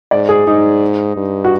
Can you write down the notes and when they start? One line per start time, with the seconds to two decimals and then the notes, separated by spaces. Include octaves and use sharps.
0.11 G#2 D5
0.29 G#4
0.47 G#2 D#4
1.17 G2
1.44 F#4